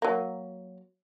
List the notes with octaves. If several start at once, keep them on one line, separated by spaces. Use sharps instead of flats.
F#3 A#3